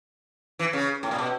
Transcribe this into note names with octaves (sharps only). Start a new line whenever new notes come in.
E3
C#3
A2
A#2
B2